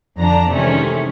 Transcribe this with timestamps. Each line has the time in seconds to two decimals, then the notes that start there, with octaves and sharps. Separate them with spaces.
0.19 F2 D3 D4 A#5
0.51 C3 D#3 E3 G#3 A3 C#4